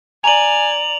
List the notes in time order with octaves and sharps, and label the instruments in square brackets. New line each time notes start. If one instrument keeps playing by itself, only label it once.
[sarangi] D5 [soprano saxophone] G#5 [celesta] A#5 D#7 [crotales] F7 F#7